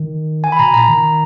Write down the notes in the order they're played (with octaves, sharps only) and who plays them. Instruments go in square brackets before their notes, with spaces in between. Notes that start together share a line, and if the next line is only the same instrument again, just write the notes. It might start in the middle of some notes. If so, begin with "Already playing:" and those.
Already playing: [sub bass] D#3
[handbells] G#5
B5
[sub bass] B2 [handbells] A#5
[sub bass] A#2 [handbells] A#5
[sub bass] D#3